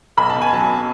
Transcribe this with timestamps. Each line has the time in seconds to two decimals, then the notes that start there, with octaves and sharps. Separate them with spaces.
0.17 B1 B5
0.30 A5
0.35 B2
0.42 G#5
0.53 F#3 A5